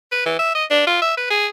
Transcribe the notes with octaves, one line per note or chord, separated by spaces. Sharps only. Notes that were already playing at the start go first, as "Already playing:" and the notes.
B4
E3
E5
D#5
D4
F4
E5
B4
G#4